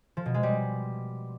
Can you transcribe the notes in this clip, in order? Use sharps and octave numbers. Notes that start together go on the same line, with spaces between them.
F3
B2
G#3
G3